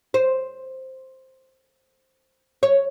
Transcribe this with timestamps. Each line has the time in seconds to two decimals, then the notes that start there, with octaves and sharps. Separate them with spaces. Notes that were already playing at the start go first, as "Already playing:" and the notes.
0.14 C5
2.63 C#5